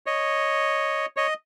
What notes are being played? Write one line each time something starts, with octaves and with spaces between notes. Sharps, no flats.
C#5 D#5
C#5 D#5